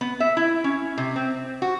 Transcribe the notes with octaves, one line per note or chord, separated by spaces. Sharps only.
B3
E5
E4
C#4
C3
C4
F#4